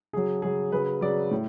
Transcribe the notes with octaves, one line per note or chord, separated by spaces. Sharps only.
C#3 F#3 G#4
C#3 F#3 G#4
C#3 F#3 B4
C#3 F#3 D5
A2